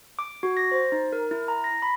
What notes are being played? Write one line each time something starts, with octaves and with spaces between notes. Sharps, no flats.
D6
F#4
A#6
C5
D#4
A#4
E4
A#5
A#6
B5